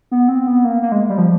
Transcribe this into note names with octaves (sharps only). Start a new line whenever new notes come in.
B3
C4
B3
A#3
A#3
G#3
G3
F3